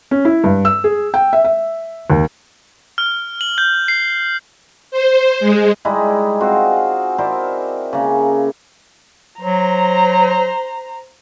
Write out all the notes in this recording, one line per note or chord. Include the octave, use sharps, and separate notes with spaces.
C#4
E4
G2
E6
G#4
G5
E5
E5
D#2
F6
F#7
G6
C7
C5
G#3
G3 G#3 D#4 E4
C4 F4 F#4 G#4
E4 A#4 C5 D5
C#3 A#3
F#3 C5 A#5